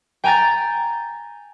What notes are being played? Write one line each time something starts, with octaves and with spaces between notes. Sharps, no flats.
G5 G#5 A#5 G6 A6